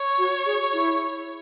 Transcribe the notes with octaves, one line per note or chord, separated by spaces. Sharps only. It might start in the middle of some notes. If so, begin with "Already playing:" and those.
Already playing: C#5
F#4
G#4
E4